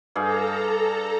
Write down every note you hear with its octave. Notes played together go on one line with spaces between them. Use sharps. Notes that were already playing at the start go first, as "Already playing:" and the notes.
G2 G#4 A4 F5 A#5